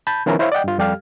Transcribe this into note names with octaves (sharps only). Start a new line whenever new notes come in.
A5 B5 G6
D#3 F3 B3 C#4 E4 A#4
E4 C5 C#5 E5 F5
D5 D#5 F#5 G5
G2 F4
F2 G3 G4 A4 F5 F6